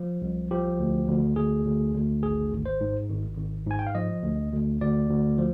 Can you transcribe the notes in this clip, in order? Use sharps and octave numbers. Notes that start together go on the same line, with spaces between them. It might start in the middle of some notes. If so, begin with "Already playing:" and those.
Already playing: F3
C2
F3 G4
D2
D2
D2 G#4
D2
D2
G#1 G#4
G#1
C5
G#2
G#1
G#1
G#2 G#5
G5
F5
F3 D#5
D2
D2
D2 D5
D2
F3